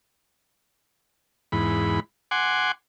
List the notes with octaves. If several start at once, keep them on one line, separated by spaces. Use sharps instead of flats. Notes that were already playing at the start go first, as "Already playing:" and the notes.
E2 G#2 B5
F#5 G#5 C6 D6